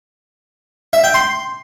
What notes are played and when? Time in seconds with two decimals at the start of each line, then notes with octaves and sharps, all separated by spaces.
0.93 E5
1.04 G5
1.14 C6